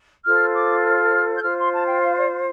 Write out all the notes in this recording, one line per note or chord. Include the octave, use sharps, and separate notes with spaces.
F4 A4 C5 F6
D6
F6
G6
F4 C5 F6
C6
A5
G5
F5
D5